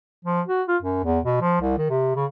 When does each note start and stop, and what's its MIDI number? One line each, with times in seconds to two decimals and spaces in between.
0.24 0.41 53
0.47 0.62 66
0.68 0.77 65
0.82 1.00 42
1.04 1.19 40
1.24 1.38 47
1.41 1.58 53
1.61 1.75 36
1.78 1.87 51
1.90 2.13 48
2.16 2.25 49